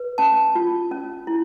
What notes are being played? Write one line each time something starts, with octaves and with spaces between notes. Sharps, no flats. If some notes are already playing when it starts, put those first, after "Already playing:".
Already playing: B4
C#4 A5
F4
C#4
E4